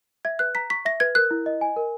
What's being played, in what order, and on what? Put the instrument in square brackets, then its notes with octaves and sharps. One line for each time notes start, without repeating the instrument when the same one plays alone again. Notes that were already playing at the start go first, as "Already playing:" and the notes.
[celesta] E5 [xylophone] G#6
[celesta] B4 [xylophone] F#6
[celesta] A#5 [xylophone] B6
[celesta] C#6 [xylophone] B6
[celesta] E5 [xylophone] A#6
[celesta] B4 [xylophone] G#6
[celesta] A#4 [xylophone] F#6
[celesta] E4
D#5
G#5
A#4